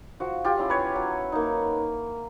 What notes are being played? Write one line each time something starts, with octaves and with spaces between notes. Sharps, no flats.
F3 F#4
F4 G4
G#3 C#4 E4
B4 C#5
F#3
A#3 D#4